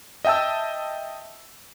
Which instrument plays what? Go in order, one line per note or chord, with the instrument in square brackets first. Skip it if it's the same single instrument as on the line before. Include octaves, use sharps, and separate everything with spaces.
[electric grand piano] D#5 E5 G5 A5 E6